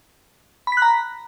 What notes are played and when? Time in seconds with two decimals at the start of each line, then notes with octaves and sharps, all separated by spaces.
0.67 B5
0.72 B6
0.77 F#6
0.82 A#5